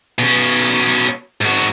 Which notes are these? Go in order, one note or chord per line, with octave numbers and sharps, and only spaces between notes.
B2 C#4
G#2 F#4